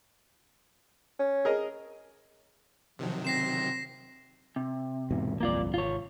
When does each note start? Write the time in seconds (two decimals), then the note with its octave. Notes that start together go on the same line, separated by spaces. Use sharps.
1.19 C#4
1.45 G#4 A#4 D#5
2.99 C3 D#3 F3 F#3
3.25 C4 A#6 C7 E7
4.56 C3
5.11 E2 G#2 B2
5.40 G1 C2 F2 A#3 F4 D5
5.74 G#1 F4 C#5